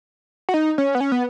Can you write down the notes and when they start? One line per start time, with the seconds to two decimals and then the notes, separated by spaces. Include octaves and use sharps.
0.49 F#4
0.54 D#4
0.78 C#4
0.95 B3
1.01 C#4
1.12 B3